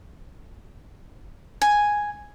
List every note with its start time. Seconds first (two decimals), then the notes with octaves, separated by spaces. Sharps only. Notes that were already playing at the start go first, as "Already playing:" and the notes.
1.62 G#5